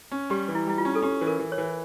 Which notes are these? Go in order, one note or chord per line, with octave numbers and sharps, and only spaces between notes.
C#4
G3 G4
E3
E4
G3 E4
F4
C#4
A4
C#4 G4
E3
A#4
E3
C#5
E3